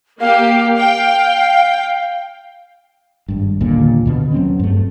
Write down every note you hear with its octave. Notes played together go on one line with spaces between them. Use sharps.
A#3 G4 F5
G5
G#1 G2
D#2 A#2 D3
D#2 B2 D3
F#3 C4 C#4
G2 A3